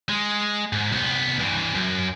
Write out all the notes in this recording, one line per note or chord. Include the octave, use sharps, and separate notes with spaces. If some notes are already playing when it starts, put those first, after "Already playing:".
G#3
G#2
C2 B3
G2 E3
F#2